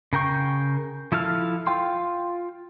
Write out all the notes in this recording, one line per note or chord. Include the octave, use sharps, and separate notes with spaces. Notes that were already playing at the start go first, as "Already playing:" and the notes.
C#3 A#4 G5 C#6
F3 E4 A4 F5 F6
F4 F5 G5 C6